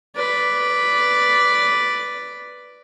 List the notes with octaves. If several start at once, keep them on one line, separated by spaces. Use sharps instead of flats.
B4 D5